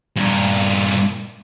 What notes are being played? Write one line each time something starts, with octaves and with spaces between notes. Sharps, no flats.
G2 A#2